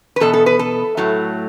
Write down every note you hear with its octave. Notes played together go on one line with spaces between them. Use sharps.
B4
E2 B2 B3 A4
A4
B4
A4
A2 F#3 A3